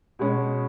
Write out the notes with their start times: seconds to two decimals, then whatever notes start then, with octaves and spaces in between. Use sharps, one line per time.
0.19 B2 G#3 C#4